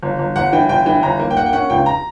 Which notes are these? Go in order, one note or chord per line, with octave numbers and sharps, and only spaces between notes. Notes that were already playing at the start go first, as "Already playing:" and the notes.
G1
G1
G1 F#5
E3 G5
G1 G5
E3 G5
G1 A#5
A#3
G5
A#3 F#5
G5
C#4 F#5
C#2 G5
A#5